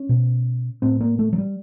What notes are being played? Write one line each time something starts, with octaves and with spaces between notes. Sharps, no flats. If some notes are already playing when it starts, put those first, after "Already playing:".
Already playing: C#4
B2
A2 C4
A#3
A3
F#3
G3